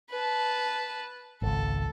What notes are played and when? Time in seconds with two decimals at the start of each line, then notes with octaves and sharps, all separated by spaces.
0.10 B4 A5
1.42 G#1 C#2 A4